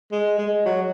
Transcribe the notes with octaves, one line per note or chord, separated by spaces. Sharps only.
G#3
G#3
F#3